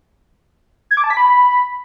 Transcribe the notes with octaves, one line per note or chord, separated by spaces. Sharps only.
G#6
D6
A5
B6
B5